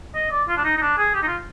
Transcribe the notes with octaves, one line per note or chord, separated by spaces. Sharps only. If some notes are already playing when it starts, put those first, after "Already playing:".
D#5
D5
F4
D4
D#4
D#4
D4
G#4
G4
D#4
F4